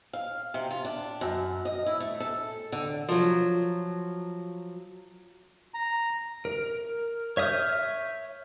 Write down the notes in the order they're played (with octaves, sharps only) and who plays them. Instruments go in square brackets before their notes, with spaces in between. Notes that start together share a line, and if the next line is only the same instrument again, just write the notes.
[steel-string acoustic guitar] F5
C3
F4
D4
F#2
D#5
E4
A3
A4
D3
F3 F#3
[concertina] A#5
[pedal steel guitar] A#4
C#5 E5 D#6 F6 G6